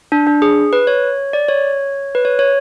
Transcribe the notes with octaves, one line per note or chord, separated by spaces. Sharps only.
D4
D4
G#4
B4
C#5
D5
C#5
B4
C#5
C#5